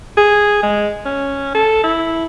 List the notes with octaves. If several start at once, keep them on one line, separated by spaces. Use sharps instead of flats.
G#4
G#3
C#4
A4
E4